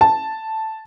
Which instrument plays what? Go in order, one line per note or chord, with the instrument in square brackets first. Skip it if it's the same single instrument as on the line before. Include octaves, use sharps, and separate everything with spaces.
[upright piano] A5